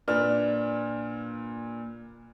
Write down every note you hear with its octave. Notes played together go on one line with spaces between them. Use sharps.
A#2 D4 B4 F6